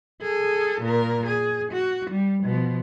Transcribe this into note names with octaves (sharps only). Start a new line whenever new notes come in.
G#4 A4
A#2 A#4
G#4
F#4
G3
B2 F3